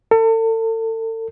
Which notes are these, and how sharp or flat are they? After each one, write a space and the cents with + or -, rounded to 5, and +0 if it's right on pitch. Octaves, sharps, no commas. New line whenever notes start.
A4 +35